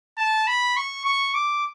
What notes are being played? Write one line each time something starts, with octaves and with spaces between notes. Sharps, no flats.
A5
B5
C#6
C#6
D6